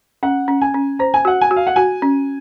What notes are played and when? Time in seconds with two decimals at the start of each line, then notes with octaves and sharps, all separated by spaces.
0.23 C#4 F#5
0.48 C#4
0.62 G#5
0.74 C#4
0.99 C5 A#5
1.14 G#5
1.25 F#4 F#5
1.41 G#5
1.51 F#4
1.56 F5
1.67 F#5
1.76 F#4 G#5
2.02 C#4